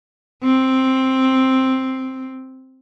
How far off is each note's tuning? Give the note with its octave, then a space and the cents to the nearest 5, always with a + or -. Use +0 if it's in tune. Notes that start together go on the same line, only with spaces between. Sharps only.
C4 +5